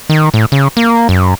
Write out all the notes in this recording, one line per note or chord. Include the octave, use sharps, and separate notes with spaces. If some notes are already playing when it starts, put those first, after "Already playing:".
D#3
A2
C#3
A#3
F#2